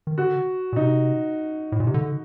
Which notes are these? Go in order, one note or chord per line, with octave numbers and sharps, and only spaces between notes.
D#3
D3 F#4
A#2
C3 D#4
A2
A#2
C3
D3